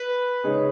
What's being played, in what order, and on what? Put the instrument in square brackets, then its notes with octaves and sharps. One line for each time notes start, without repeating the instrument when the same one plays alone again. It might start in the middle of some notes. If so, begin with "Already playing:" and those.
Already playing: [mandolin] B4
[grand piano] C#3 G#3 D#4 G#4 C#5